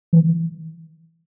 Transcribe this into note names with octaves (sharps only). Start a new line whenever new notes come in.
E3